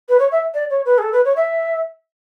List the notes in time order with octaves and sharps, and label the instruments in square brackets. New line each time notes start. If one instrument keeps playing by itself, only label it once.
[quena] B4
C#5
E5
D5
C#5
B4
G#4
A4
B4
C#5
E5